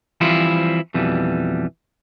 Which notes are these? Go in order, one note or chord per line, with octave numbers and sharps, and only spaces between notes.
E3 F3 G3 C4 E4 F4
F2 B2 E3 G3